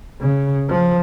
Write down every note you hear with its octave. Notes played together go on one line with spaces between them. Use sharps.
C#3
F3